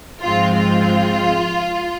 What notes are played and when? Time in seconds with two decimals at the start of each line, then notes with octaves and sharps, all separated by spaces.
0.22 G#2 F3 G#3 C4 F4
0.57 F4